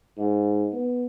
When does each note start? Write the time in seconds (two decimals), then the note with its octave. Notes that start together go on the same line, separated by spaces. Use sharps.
0.18 G#2
0.73 B3